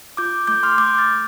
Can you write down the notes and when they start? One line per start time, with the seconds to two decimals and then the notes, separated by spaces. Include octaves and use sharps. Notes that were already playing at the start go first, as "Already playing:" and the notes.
0.17 F4 D6 G6
0.47 A3 D6 G6
0.63 C6 F6
0.78 A3 D6 G6
0.98 F6 A6
1.08 A3